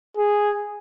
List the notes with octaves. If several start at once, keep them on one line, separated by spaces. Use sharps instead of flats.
G#4